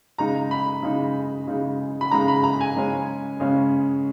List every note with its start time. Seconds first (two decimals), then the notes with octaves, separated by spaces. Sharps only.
0.18 C#3 G#3 D#4 A#5
0.51 B5
0.83 C#3 G#3 D#4
1.47 C#3 G#3 D#4
2.01 B5
2.11 C#3 G#3 D#4 A#5
2.28 B5
2.43 A#5
2.61 G#5
2.76 C#3 G#3 C#4
3.40 C#3 G#3 C#4